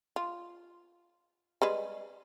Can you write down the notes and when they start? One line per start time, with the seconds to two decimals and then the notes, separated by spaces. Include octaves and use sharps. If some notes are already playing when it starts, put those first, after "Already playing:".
0.16 F4
1.62 G3 G#3 B4